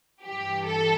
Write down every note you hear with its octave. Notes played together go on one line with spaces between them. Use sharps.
G2 E3 G4
A4